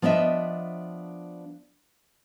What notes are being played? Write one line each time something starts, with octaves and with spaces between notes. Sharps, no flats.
F3 B3 D4 D#5 E5